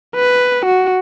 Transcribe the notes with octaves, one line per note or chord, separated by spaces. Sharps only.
B4
F#4